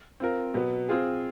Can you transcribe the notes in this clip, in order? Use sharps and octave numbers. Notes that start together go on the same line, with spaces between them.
C4 F4 A#4
B2 F#3 B3
C4 F4 G#4